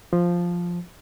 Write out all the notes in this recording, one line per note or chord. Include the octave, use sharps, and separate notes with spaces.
F3